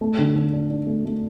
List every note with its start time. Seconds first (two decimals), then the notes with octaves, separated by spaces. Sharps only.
0.01 A3
0.18 D3
0.35 D3
0.53 D4
0.70 D4
0.87 A3
1.05 A3